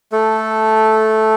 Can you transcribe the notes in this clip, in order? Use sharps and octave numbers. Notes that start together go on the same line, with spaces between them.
A3 A4